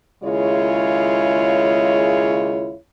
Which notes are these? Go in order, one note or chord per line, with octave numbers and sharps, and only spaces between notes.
D#2 C#3 G#3 E4 F4 C#5